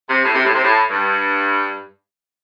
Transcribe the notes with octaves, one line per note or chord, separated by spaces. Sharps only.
C3
A2
C3
A2
C3
A2
G2